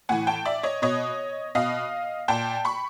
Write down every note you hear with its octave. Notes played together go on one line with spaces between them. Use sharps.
A2 E3 F#5 G#5
G5 A5
D5 E5
C#5 D#5
B2 C#5 D#5
B2 D#5 F5
A#2 G5 A5
B5 C#6